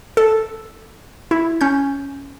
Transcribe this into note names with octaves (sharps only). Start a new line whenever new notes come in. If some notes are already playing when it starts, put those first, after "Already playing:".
A4
E4
C#4 G6